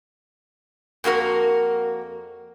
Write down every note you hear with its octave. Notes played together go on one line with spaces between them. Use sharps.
F2 A#3 F#4 A#4